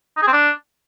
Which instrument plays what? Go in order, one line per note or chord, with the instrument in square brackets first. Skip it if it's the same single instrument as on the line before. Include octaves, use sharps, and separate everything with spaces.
[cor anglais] D#4
G#4
C4
D4